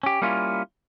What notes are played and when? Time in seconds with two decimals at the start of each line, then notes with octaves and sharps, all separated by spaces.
0.03 C#4 G4
0.22 G3 A#3 C#4 E4 F4